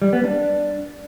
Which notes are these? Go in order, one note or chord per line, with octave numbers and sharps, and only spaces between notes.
G3
B3
D4